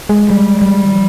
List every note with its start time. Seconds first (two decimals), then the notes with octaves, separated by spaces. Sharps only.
0.09 G#3
0.30 G3
0.61 G3
0.85 D#3
0.93 F3